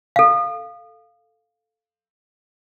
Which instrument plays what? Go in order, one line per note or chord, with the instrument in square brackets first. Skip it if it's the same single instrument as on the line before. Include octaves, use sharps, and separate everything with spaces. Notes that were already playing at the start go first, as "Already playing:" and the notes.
[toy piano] A4 F5